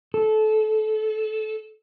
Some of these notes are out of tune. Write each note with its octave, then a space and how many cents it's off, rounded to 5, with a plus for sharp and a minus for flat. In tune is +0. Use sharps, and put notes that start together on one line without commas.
A4 -25